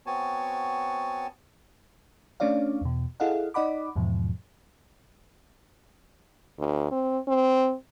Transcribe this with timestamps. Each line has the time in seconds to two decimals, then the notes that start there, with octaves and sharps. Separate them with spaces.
0.06 B3 C4 F#4 C#5 G#5 A5
2.40 A3 C#4 D4 C#5 D5 F5
2.81 E2 B2
3.20 E4 G#4 A4 D#5 F5 F#5
3.54 D#4 D5 D#5 F#5 B5 D6
3.96 E2 G#2 B2 F3
6.59 D2
6.92 C4
7.28 C4